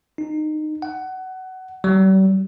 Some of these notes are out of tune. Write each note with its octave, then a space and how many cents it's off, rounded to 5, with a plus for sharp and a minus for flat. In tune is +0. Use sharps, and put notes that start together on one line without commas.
D#4 -20
F#5 +20
G3 -45